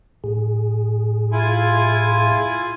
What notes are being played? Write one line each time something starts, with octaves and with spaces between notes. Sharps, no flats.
A2 G#4
E4 F4 G#5